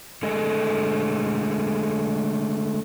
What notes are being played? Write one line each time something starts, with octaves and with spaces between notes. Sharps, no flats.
D3 G#3 A3 G#4 A4 D#5